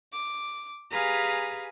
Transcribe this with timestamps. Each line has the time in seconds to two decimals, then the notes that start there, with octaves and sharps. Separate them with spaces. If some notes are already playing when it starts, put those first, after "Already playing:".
0.14 D6
0.91 G4 G#4 B4 F5 G#5 A#5